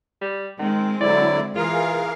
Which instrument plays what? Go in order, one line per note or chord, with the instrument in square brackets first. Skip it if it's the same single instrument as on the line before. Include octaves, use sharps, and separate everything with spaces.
[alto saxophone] G3
[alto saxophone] D#3 [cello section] G#3 C4
[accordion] D3 F#3 E4 [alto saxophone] D5
[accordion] E3 G#4 A#4 [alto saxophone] F4 [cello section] F5